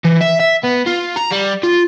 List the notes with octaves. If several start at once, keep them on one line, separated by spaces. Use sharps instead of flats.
E3
E5
E5
B3
F4
A#5
G3
F4